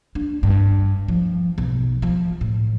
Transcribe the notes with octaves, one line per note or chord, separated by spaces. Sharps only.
D4
G2
F3
B1
F3
A2